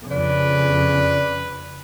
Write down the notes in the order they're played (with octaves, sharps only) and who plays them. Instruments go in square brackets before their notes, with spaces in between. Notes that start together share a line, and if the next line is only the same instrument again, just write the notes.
[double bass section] F2 C#3 [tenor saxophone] D4 [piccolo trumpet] B4